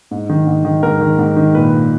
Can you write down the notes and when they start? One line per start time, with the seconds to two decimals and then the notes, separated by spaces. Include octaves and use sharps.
0.11 G#2
0.29 D#3
0.47 G#2
0.65 D#3
0.83 G#2 A#4
1.01 D#3
1.18 G#2
1.37 D#3
1.55 A#2 B4
1.72 A#2